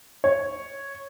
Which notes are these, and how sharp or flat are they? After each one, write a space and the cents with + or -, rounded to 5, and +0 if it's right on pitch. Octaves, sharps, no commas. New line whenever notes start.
C#5 -5